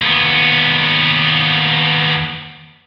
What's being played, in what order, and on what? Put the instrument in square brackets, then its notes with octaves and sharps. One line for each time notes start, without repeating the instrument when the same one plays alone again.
[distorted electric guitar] D#2 B3